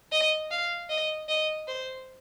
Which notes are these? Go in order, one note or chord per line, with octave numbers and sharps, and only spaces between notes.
D#5
F5
D#5
D#5
C5